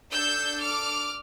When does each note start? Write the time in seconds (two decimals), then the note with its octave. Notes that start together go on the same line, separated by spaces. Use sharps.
0.11 D4 A4 E6 G6
0.61 D6 F6